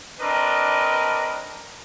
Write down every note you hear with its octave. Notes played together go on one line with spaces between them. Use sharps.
C4 D4 A#4 B4 D#5